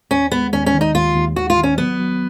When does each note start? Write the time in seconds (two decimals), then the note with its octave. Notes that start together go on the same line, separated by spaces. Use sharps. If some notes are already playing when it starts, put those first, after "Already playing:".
0.11 D#2 C#4
0.31 G#3 B3
0.53 D#2 C#4
0.66 C#4
0.74 D#3
0.81 D#4
0.94 D#2 F4
1.16 D#2
1.36 D#2 F#4
1.50 F4
1.57 D#3
1.63 C#4
1.78 F#3 B3
1.99 F#3